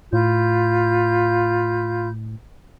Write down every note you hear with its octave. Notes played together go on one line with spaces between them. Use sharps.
A2 F4 B5 G6